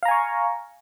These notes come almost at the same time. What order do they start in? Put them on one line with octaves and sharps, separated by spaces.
F5 A#5 G#5 C#6